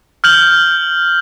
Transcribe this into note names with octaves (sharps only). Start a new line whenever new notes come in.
F6 G6 F#7